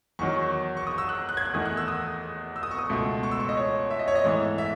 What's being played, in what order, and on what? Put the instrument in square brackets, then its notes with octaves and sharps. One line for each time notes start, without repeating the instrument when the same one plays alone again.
[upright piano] E2 D#3 F#3 C#6
C#6
D#6
E6
F#6
F#6
G#6
F#6
E2 D#3 A3 D#6
F#6
E6
D#6
E6
D#6
C#6
D#6
C#2 B2 A3
C#6
E6
C#6
D#5
C#5
E5
D#5
C#5
D#5
G#2 E3 A3
E5